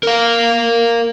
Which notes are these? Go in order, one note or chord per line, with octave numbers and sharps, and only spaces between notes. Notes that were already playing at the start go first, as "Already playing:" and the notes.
A#4 F5